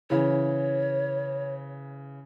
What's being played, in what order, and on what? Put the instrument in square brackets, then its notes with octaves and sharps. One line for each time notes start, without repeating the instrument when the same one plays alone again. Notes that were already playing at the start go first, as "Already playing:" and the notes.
[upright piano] C#3 E3 [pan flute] C#5